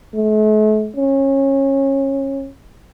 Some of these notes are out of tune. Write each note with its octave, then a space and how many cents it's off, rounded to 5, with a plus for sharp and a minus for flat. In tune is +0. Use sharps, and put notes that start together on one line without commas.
A3 -40
C#4 -25